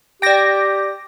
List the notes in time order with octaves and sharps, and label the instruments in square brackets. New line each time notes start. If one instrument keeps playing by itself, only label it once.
[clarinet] G4 [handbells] D5 G6 D7 [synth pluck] G5 A#6